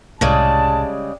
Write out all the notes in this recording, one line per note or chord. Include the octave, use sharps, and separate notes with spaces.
C2 A2 C#3 G3 G#3 A5